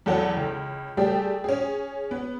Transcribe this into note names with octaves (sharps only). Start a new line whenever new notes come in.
E2 F#3 A4 F#5
C#2
G3 A3 G4 G#4
C#4 G#4
B3